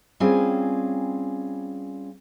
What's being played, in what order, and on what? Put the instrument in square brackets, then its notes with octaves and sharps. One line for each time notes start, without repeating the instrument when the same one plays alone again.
[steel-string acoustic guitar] G3 C4 C#4 F4 G#4 G#5